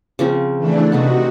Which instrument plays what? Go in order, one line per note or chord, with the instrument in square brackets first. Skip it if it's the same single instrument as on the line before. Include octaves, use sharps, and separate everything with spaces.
[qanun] C#3 F3 C4
[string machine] E3 A3 D4
[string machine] C3 F#4 [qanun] B3 D#4 D#5